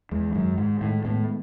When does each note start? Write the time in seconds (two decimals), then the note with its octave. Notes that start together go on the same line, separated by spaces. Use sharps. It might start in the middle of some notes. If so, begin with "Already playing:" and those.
0.11 E2 G#3
0.35 F#2 D#3
0.58 G#2 G#3
0.81 A2 D#3
1.05 A2 B3